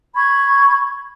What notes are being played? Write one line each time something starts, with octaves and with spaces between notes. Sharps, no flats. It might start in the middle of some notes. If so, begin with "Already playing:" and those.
B5 C#6 G#6